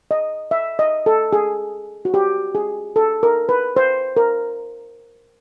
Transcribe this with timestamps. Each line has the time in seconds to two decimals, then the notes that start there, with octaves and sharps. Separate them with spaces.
0.11 D#5
0.51 E5
0.79 D#5
1.06 A4
1.33 G#4
2.05 F#4
2.14 G4
2.55 G#4
2.96 A4
3.23 A#4
3.49 B4
3.76 C5
4.17 A#4